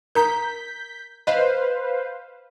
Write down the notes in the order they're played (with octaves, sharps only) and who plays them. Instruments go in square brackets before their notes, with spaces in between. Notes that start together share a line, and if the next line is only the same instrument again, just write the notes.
[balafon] A#4 A#5 [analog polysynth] G6 B6
[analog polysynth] B4 C5 F5 [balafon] D#5